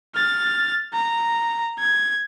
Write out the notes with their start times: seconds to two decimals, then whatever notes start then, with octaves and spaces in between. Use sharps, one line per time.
0.15 F6 A6
0.93 A#5
1.79 G#6